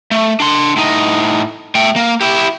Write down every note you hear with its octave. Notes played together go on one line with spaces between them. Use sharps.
A3
D4 C6
A2 D#4
A3 G5
A#3
E4 G4